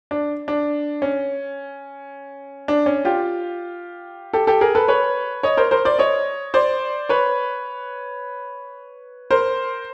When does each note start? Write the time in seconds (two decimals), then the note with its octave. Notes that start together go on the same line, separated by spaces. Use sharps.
0.11 D4
0.48 D4
1.02 C#4
2.68 D4
2.86 C#4
3.05 F4 G4
4.33 G4 A4
4.47 G4 A4
4.61 G#4 A#4
4.75 A4 B4
4.88 B4 C#5
5.43 C#5 D#5
5.57 A#4 C5
5.71 A#4 C5
5.85 C5 D5
5.99 C#5 D#5
6.54 C5 D5
7.09 B4 C#5
9.31 A#4 C5